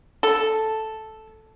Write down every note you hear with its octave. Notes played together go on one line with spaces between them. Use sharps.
A4